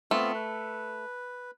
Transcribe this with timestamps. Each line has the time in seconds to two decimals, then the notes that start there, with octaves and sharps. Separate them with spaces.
0.11 A3 B3 C4 F4
0.35 B4